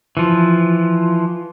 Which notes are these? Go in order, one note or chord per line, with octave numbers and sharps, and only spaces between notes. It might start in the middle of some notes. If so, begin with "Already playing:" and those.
E3 F3